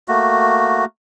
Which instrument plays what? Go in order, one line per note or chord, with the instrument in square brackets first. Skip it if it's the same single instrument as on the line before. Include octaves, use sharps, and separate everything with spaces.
[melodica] A3 A#3 F#4